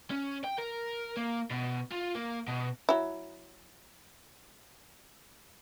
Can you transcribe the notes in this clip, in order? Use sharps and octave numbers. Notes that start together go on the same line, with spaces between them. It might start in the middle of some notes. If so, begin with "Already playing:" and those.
C#4
G5
A#4
A#3
B2
F4
A#3
B2
F#3 E4